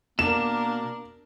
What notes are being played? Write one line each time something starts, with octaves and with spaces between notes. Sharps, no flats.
B2 A#3 D4 A#4 E7